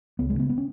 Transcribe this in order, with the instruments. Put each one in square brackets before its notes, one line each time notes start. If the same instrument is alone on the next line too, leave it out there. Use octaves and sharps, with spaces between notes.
[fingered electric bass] C#2 B3
G#3
C#3 B3
B3
C#4